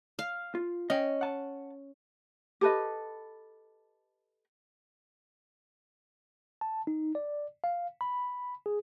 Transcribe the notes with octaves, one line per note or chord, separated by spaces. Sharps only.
F5
F4
C#4 D#5 G5
F#5 A5
G4 A4 B4 D#5
A5
D#4
D5
F5
B5
G#4